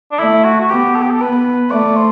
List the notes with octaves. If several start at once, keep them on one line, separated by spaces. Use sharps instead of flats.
D4
A3 E4
F#4
F#4
B3 G4
A4
G4
A4
B3 B4
A3 D5
C5